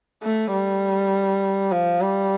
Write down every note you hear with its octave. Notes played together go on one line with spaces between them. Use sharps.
A3
G3
F3
G3